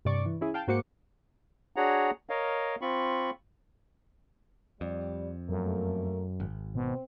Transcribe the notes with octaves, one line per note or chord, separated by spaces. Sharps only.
G2 C3 D5 C#6
E3
C#4 E4 G#4
F5 G5 A5
G#2 A#3 F#4 C5 D6 C#7
D4 F#4 G#4 C#5 F#5 A#5
A#4 C#5 D#5 F5
C4 F4 B5 C#6
F2 G3 D5
F#2 A3 A#3 A#4
G#1
B2 C4